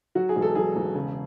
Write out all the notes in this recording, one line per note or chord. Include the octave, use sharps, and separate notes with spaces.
F#3 F#4
G#4
E1
A4
F#3 G#4
E1
C#3